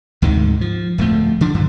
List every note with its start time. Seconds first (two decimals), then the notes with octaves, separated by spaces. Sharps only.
0.22 D2 G#2 C3 D#3
0.61 F3
0.98 D1 F2 F3 A3
1.41 D3 F3 D4
1.54 G2 D3 F#3